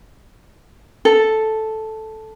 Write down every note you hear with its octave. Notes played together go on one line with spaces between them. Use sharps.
A4